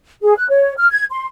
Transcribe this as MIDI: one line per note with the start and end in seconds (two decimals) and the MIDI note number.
0.22 0.35 68
0.36 0.46 90
0.49 0.73 73
0.77 0.86 89
0.91 1.05 92
1.11 1.26 84